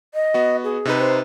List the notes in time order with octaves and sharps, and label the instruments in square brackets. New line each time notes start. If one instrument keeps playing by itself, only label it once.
[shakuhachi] D#5
[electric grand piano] B3 F#4
[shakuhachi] G#4
[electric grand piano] C3 D#4 B4
[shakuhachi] C5